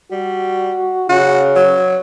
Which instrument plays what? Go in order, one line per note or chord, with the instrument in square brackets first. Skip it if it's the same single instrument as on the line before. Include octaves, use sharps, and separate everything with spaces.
[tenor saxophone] G3 [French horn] F#4
[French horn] C#3 [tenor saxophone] F#4
[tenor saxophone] F#3